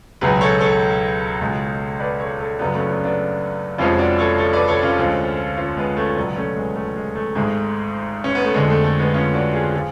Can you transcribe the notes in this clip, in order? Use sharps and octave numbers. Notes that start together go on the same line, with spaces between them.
C#2 B2 F#3 G#4 B4
A4 C#5
A4 C#5
C#2 B2 G#3
B4 D5
A4 C#5
A4 C#5
F#1 F#2 C#3 F#3 B3 D4
A3 C#4
B3 D4
B3 D4
F1 F2 F3 G#3 C#4 F4
D4 F#4
A4 C#5
A4 C#5
B4 D5
A4 C#5
C#4 F4
D2 D3 F3 G#3
C#4 F4
G#3 B3
A3 C#4
C#2 B2 F#3 B3 D4
A3 C#4
G#3 B3
A3
G#3
A3
G#1 G#2 G#3
C#4
B3
A3
F2 D3 G#3
A3
A3
G#3 B3
C#4 F4
D4 F#4
F4 G#4
F3 F4 G#4